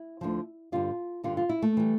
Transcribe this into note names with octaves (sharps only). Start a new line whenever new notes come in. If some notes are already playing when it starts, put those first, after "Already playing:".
Already playing: E4
D2 D3 F3
G2 D3 G3 F4
G2 D3 G3 F4
F4
E4
A3
E3 G3